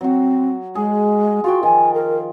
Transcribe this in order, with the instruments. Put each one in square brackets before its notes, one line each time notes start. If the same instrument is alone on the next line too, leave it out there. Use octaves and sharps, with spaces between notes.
[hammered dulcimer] F#3 F#4 [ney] C4
[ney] G#3 [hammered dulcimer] G#4
[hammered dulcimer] F4 G5 [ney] F#4
[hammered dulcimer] D#3 F3 [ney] G#5
[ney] A#4